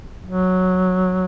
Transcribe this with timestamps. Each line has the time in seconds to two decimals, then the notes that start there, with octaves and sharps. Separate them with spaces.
0.25 F#3